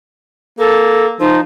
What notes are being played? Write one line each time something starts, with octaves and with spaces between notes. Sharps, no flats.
A#3 A4
F3 D#4